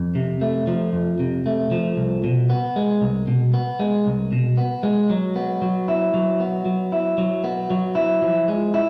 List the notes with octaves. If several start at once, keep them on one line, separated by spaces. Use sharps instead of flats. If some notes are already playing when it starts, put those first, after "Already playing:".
Already playing: F2
C3
A3
F3
F2
C3
A3
F3
C2
B2
B3
G#3
C2
B2
B3
G#3
C2
B2
B3
G#3
F#3
B3
F#3
E4
F#3
B3
F#3
E4
F#3
B3
F#3
E4
F3
G#3
E4